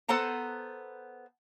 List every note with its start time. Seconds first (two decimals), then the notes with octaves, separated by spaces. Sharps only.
0.08 B3 A4 C5 F#5 A5 A#5